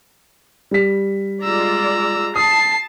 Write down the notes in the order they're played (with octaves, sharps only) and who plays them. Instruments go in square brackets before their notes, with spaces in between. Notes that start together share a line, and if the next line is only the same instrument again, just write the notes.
[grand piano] G3 B6
[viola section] G#3 F4 D5 [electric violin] A#5 E6
[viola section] A5 [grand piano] D#6 [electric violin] C7